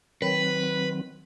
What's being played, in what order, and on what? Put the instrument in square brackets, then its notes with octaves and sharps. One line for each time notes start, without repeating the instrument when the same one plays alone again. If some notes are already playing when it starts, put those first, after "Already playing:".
[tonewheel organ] D#3 F#3 C4 [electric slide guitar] B4